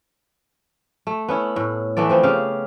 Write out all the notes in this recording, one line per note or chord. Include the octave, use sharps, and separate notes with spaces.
A3
B3 C#4 E4
A2
E3 A3 B3 D5
F3 B3 C4
C#3 G4 F5